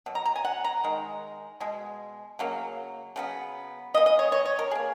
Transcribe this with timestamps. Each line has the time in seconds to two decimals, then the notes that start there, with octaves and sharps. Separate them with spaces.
0.06 B2 F#3
0.15 A#5
0.25 A#5
0.36 G#5
0.45 F#5
0.64 A#5
0.84 D#3 G#3
1.60 B2 G#3
2.39 C#3 F#3 A#3
3.16 C#3 F#3 B3
3.94 A#3 D#5
3.97 E3
4.06 D#5
4.19 C#5
4.32 C#5
4.45 C#5
4.59 A#4
4.71 E3 A#3 G#4